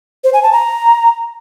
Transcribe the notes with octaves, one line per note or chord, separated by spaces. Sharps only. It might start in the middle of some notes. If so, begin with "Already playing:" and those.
C5
G#5
A5
A#5